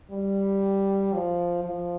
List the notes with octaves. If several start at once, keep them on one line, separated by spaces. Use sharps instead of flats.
G3
F3
F3